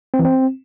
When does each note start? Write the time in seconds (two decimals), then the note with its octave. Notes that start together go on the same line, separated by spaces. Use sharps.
0.14 C4
0.19 E3
0.25 C4